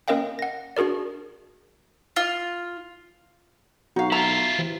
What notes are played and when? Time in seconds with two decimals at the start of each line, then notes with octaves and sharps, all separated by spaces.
0.08 A#3 C#4 A#4 D#5 F5 G5
0.39 F#5 A#6
0.77 D4 F#4 G#4 A#4 D5
2.16 F4
3.96 B1 D#4 F#4 F5
4.12 E4 F4 A#5
4.59 E3